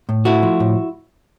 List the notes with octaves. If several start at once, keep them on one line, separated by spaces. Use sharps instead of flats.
A2
A3 E4 F#4
F3
A2